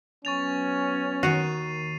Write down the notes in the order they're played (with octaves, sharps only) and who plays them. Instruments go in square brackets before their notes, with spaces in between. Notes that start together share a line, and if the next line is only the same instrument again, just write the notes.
[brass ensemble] F#3 B3 C#4 [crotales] C#6 A6 F7
[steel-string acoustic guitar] D#2 D#3 D#5 [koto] F#4 [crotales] C7 D#7 F7